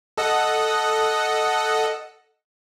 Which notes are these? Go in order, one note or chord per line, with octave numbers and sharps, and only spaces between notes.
A4 D#5 F#5